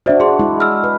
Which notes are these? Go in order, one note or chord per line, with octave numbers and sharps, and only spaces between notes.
D4 F#4 C5 D5 E5
F#4 G#4 C6
G#3 E4
E6 F6
B4